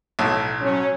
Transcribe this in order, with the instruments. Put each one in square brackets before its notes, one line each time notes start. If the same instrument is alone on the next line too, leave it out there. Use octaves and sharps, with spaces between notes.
[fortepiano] B1 A2
[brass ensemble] F#3 C#4